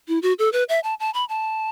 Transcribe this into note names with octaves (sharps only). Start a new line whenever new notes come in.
E4
F#4
A4
B4
E5
A5
A5
B5
A5